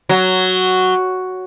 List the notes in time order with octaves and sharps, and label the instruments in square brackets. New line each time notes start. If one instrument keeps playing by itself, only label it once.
[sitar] F#3